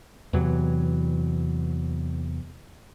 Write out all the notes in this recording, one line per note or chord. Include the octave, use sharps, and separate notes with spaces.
E2 C3 E3 F#3